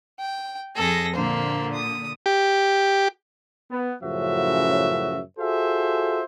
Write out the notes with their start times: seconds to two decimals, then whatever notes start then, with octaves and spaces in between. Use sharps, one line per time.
0.19 G5
0.76 F2 G#4 A4 A#6
1.15 A#2 D3 A#3 C5
1.73 D#6
2.26 G4
3.71 B3
4.03 F#2 A2 C#3 F3 F#4 E5
5.39 F4 F#4 G#4 A4 C5 E5